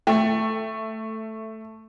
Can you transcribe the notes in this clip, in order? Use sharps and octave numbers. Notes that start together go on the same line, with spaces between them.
A3 G5